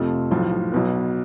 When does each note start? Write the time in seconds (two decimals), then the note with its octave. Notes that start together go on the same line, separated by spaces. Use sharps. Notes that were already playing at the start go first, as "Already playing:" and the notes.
Already playing: F2 C3 F3 A3
0.31 B1 A2 F3
0.72 B1 B2 B3